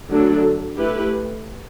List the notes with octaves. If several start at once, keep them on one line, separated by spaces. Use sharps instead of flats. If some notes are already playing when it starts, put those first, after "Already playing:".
D3 F#3 A3 D4 A4
A3 E4 G4 B4